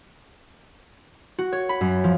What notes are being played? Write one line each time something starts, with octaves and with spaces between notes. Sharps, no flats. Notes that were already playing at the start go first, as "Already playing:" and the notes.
F#4
C#5
B5
F#2
F3